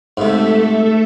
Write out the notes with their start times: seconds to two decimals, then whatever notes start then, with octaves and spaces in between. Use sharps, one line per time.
0.17 G#2 C3 A3 A4 E5